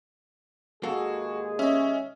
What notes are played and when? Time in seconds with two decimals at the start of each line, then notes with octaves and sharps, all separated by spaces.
0.83 D#2 G#3 A#3 F#4 G#4 A4
1.59 C#4 D#5 E5